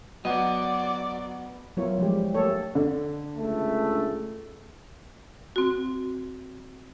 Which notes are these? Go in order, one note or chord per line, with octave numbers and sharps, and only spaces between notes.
F#3 B3 F#4 D5 D#5 F#5
F#3 B3 E4 F4 A#4 C#5
F3 G3 G#3 G4
A3 A#3 G4 A4 C#5
D3
C#2 A3
C4 F#4